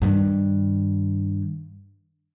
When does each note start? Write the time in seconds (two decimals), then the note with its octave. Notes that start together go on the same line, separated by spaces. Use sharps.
0.02 G2 D#3